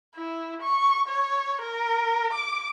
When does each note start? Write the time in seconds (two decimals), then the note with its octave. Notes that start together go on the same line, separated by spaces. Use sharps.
0.16 E4
0.62 C#6
1.08 C#5
1.62 A#4
2.33 D6